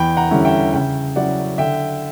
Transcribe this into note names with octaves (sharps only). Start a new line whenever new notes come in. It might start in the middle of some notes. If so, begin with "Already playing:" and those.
Already playing: E2 G5 B5
F#5 A#5
D3 G3 C#4 E4
E5 G5
C#3 E5 G5
F#3 C#4 E4 D5 F#5
D3 E5 G5